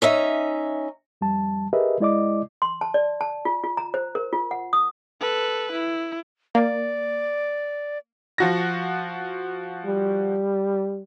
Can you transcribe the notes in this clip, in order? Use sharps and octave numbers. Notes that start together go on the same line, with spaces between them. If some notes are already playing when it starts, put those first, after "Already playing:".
C#4 D#4 E5
F2 G3 A5
G4 G#4 A#4 B4 D#5 E5
G#3 E4 D5 D#5 D6
C6
A5
D5
A5
F4
F4
A#5
C5
A#4
F4
F#5
D#6
A4 B4
E4
A#3 D5
F3 F#4 A#6
G3